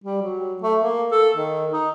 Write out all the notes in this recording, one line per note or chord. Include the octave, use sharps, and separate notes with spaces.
G3
F#3
A3
A#3
A4
D#3
D#4